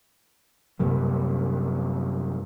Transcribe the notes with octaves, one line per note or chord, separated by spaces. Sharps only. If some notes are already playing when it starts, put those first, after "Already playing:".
F#2 C3 G3 A#3